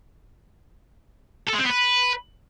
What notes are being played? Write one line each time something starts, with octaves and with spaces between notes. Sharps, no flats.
A4
G#3
C4
B3
B4